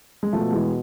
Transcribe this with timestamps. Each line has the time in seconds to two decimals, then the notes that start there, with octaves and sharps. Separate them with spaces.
0.23 G#3
0.33 B2 F3 A3
0.52 E3 G#3